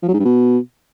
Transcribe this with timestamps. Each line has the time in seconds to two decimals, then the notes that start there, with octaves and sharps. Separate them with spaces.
0.02 F3
0.08 F#3
0.14 G#2
0.19 G2
0.25 B2